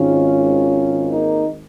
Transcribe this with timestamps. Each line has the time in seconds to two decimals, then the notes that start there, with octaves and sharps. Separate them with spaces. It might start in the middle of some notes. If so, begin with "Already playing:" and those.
Already playing: G#1 G#2 D#3 C#4 F4
1.11 A#3 D#4